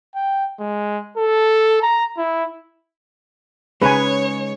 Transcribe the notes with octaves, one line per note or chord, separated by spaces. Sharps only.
G5
G#3
A4
A#5
E4
C#3 G#3 C#4 D#4 G#4 B4 C#5 G#5